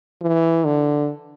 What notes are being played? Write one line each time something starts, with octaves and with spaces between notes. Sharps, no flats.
E3
D3